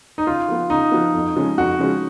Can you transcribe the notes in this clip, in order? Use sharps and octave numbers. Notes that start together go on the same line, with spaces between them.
D#4
C#3 F4
F3 B3
C#3 D#4
F3 B3
F2
C#3 F3 G#3 C#4
F2 F#4
C#3 F3 G#3 C#4